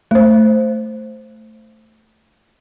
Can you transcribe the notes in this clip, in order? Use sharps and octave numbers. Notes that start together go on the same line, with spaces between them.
A3 C5